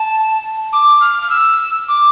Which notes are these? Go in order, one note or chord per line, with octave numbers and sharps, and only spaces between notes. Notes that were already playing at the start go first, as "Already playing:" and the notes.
Already playing: A5
D6
F6
F6
E6
D6